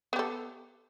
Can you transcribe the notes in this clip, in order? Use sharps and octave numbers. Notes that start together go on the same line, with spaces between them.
B3 G4 A4